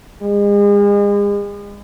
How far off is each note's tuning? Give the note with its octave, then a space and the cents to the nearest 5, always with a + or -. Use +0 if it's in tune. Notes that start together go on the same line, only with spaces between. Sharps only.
G#3 -40